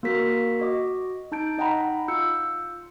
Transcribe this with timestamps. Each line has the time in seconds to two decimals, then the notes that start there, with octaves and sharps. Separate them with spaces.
0.03 A#3 F#4 A#4 B6
0.60 F#4 D#5 D6
1.32 D#4 A5 G6 D7
1.58 D#4 D#5 F#5 G5 A#5 B5
2.08 F4 E6 G6 C#7